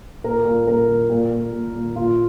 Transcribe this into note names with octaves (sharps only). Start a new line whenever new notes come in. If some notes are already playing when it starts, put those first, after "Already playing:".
A#2 A#4
A#2
A#2 A#4
A#2
A#2
A#2
A#2
A#2
A#2 F4